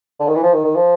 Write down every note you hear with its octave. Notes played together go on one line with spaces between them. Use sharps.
D3
D#3
E3
F3
D#3
D#3
F3